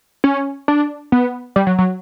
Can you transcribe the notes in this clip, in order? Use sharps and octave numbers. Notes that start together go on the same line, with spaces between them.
C#4
D4
B3
G3
F#3
F#3